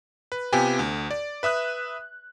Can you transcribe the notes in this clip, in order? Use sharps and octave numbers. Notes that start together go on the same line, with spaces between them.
B4
C3 B3 F4 G4 G5 G#5
D2
D5
B4 E5 D#6 F#6